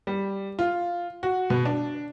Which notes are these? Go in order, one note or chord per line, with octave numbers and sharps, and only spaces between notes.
G3
F4
F#4
B2
D4